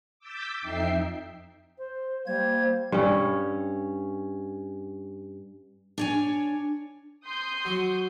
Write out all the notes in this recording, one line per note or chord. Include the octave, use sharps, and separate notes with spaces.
D6 E6 G6 A6 B6
F2 D#4 E5 G5 C7
C5
G3 A#3 C5 G#6
G2 C#4
D4 C#5 G#5
C6 D#6 G6
F#3